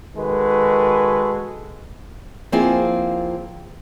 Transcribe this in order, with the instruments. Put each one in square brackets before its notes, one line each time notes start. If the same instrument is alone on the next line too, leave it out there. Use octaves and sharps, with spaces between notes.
[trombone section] D#3 G#3 F#4 A4 B4
[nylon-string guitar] F3 A#3 C4 E4 F4 G#4